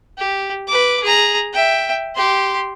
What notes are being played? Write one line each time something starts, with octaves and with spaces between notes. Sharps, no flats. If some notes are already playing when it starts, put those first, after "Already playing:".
G4
B4 D6
G#4 A#5
E5 G5
G4 C6